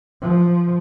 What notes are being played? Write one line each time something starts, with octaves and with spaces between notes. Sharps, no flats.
F3